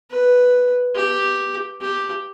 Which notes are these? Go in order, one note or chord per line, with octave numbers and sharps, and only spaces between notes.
B4
G4
G4